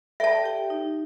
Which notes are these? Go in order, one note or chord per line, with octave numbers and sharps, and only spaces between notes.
A4 D5 E5 G5 A5
G4 G5
D#4